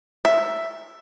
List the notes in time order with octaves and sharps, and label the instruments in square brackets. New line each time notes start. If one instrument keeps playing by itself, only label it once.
[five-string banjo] E5